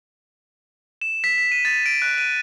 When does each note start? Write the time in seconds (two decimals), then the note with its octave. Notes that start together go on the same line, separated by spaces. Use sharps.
1.01 E7
1.24 B6
1.38 B6
1.52 D#7
1.65 A6
1.86 D7
2.02 F#6
2.18 D#7